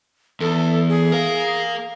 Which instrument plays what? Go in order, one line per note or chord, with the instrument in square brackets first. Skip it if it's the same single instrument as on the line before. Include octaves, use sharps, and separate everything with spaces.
[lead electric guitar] E2 [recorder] A4
[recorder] G#4
[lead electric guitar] A#4 F5